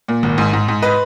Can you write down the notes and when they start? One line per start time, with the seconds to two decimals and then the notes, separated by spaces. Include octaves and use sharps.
0.08 A#2
0.23 G#1
0.38 G#2
0.53 G#2
0.68 G#2
0.82 B4 D#5